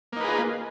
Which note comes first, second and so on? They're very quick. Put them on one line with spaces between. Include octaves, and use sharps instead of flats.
A#3 D#4 B4 G#4 F4